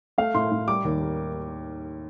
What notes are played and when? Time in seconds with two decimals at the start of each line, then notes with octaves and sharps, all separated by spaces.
0.18 A3 F5
0.34 A2 C6
0.52 A2
0.68 G3 D6
0.84 D#2
1.01 A#3